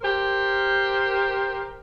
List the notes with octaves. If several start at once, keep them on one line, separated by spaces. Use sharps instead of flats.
G4 A#4 C5